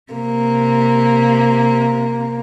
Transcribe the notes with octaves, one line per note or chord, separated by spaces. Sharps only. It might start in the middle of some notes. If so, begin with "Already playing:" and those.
C3 A#3